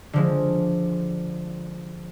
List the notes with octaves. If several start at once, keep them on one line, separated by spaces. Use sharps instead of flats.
D3 F3 G#3